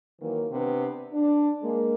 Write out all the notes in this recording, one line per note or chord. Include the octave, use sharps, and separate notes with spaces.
D#3 E3 F#3 A#3
C3 B3 D4 B4
D4
G#3 A#3